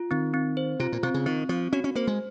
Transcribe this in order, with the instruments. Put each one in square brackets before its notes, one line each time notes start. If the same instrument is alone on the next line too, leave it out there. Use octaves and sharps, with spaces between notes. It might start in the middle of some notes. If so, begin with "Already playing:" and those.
Already playing: [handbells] F4
[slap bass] D#3 [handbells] C4
[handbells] C4
C5
[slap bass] C3 [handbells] F4
[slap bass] A#2
[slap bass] C3 [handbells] C4
[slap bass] C#3
[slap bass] D#3 [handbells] C4
[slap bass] F3 [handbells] C4
[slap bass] C#4 [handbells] F#4
[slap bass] C#4
[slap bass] A#3 [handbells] C5
[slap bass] G#3